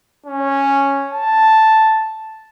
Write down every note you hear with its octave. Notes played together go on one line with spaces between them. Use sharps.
C#4
A5